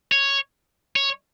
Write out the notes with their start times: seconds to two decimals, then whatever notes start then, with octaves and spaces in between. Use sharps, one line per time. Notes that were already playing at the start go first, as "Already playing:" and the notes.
0.12 C#5
0.96 C#5